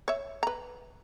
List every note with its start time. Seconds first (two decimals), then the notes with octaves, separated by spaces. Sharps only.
0.08 C#5 E5
0.43 B4 A#5